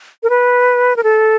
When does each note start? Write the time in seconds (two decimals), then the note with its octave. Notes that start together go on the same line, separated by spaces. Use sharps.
0.23 A#4
0.30 B4
0.96 A#4
1.03 A4